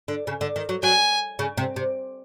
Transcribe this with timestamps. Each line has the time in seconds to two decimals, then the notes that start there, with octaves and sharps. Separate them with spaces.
0.08 D3
0.27 C#3
0.41 D3
0.56 D#3
0.69 F#3
0.83 F#3 G#5
1.39 C#3
1.57 C3
1.76 C3